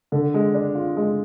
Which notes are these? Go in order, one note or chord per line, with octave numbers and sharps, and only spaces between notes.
D3
G#3
D4
F4
G#3